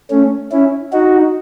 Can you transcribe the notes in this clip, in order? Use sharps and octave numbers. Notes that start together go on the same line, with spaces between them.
A3 C#4
C#4 E4
D#4 F#4